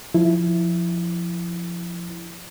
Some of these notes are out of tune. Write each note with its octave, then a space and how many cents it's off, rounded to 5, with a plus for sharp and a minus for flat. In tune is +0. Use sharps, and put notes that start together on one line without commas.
F3 +0 E4 +5